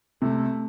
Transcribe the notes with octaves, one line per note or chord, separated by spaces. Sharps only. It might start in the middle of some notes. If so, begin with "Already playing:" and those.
C3 A3